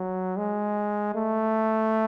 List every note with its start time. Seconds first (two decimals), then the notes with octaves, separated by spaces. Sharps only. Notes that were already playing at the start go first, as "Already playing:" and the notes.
Already playing: F#3
0.37 G#3
1.15 A3